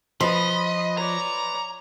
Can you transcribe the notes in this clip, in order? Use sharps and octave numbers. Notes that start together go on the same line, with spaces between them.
F3 B4 D#5 B5 C6
C#5 D5 A#5